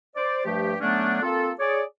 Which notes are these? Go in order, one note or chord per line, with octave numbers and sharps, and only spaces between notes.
C5 D5
G2 F3 A3 G4
D3 F#3 A3 B3 C#4 D4
A#3 C4 F4 A4
G#4 C#5 D5